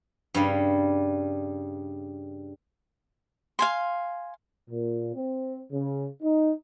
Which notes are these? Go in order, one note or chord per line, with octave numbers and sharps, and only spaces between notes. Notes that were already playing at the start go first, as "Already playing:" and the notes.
G2 C#3 G3
F5 G#5 C6
A#2
C4
C#3
D#4